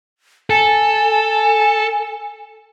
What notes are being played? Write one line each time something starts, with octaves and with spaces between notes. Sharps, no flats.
A4 G#5